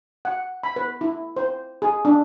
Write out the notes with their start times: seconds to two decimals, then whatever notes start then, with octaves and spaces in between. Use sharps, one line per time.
0.25 F#5
0.63 B5
0.76 B4
1.01 E4
1.37 C5
1.82 G#4
2.05 D4